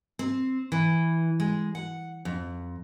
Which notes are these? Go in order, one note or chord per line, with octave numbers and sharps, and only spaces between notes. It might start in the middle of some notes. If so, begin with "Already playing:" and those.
C4
E3
G#3
F#5
F2